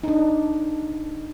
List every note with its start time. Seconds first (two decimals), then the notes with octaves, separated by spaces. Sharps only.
0.04 D#4
0.08 D4